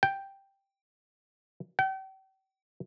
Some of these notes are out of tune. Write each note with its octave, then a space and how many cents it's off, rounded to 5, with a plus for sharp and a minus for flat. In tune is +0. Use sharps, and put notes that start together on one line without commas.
G5 +0
G5 -40